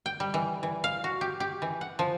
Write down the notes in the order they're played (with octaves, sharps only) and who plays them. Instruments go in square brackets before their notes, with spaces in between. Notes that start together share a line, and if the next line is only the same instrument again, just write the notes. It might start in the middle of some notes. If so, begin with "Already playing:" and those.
[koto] G5
G3
E3
E3
F5
F#4
G4
G4
E3
F#5
F3